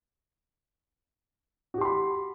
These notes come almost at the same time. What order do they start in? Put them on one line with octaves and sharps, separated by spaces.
F#4 G4 C6 B5